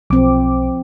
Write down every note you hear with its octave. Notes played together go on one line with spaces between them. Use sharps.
B1 F3 C4 D6